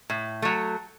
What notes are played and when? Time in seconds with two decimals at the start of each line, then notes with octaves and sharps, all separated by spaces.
0.10 A2
0.42 F#3 A3